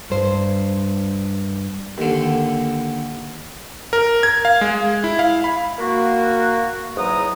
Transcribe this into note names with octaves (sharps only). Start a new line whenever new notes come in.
G2 C5
D#2 D3
A#4
G#6
F5
G#3
E4
F5
B5
A#3 F#4
E2 G#2 F#3 A#5 D#6